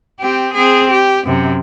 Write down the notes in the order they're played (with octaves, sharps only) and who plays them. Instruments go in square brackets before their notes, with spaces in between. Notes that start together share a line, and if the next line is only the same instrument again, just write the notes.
[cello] C4 G4
C4 G#4
G4
F#2 C3